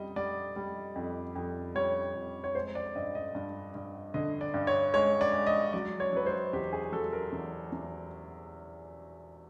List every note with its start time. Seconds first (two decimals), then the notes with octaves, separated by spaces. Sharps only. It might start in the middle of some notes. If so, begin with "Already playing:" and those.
Already playing: F2 G3 D#5
0.16 G3 D5
0.56 G3
0.96 F2
1.35 F2
1.75 G3 C#5
2.15 F2
2.44 C#5
2.55 G#3 C5
2.75 D5
2.95 G2 D#5
3.15 D#5
3.35 G2
3.75 G2
4.14 D3 D#5
4.41 D5
4.54 G2
4.67 C#5
4.93 G#3 C#5
5.21 D5
5.33 G#3
5.47 D#5
5.73 F#3 D5
6.00 C#5
6.13 F#3 B4
6.26 C5
6.53 E2 G4
6.73 G#4
6.92 F#3 A4
7.13 A#4
7.32 E2
7.72 E2